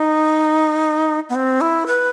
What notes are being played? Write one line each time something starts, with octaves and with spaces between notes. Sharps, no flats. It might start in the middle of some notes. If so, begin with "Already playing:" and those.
Already playing: D#4
B3
C4
E4
B4